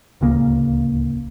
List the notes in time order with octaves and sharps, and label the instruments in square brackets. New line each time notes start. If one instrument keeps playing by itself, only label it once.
[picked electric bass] D1 C#2 C#3 A#3